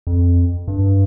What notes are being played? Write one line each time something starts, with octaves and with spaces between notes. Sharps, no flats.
F2
G2